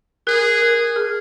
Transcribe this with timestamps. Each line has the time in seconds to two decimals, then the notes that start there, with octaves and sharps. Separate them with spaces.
0.27 G#4 A#4
0.62 A#4
0.96 G#4